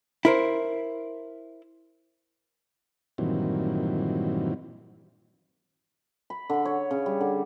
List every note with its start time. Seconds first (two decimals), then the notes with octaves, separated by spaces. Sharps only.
0.25 E4 A#4 C5
3.18 G2 A#2 D#3 E3 F#3 C4
6.30 B5
6.50 D3
6.65 C#5
6.91 C#3
7.06 G3
7.21 D3